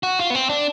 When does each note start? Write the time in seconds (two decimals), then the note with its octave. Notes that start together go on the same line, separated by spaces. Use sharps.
0.03 F#4
0.19 F4
0.30 B3
0.35 C4
0.49 D4